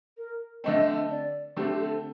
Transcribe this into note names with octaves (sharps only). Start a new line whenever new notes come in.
A#4
D3 A3 C4 D#5
D5
D3 A3 C4 G4
A4